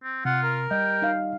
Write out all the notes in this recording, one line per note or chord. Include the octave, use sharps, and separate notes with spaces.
C4
C3 F4 F#5
A#4
G3 D#5 G5
D#4 F5